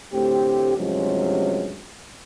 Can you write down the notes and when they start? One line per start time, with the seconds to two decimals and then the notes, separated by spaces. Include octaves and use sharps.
0.13 D2 A2 C4 G4
0.77 G2 C3 F3 F#3 G#3 C#4